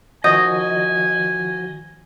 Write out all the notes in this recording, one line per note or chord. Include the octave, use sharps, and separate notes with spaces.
D#3 F3 F#4 D#5 G#5 D#6 G6